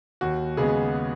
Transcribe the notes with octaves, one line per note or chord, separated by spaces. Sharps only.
D#2 F#4
C#3 G#3 B3 G#4